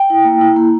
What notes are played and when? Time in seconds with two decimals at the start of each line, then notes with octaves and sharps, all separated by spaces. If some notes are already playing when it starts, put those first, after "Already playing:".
Already playing: G5
0.10 E4
0.25 A#3
0.41 E4
0.56 A#3